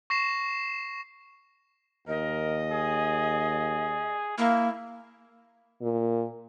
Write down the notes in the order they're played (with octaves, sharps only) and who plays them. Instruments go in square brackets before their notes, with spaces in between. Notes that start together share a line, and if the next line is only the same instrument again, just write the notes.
[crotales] C#6 A#6 C7 E7
[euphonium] D#2 [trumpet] A#4 [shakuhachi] D#5
[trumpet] G#4
[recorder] A#3 [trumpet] E4
[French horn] A#2